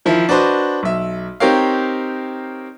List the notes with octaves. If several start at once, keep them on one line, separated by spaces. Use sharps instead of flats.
D#3 F3 E4
D4 F#4 B4 C5 D#5
B1 E5
C4 D#4 G4 A#4 C#5 F5